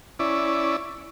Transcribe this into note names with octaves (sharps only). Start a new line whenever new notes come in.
C#4 E4 D5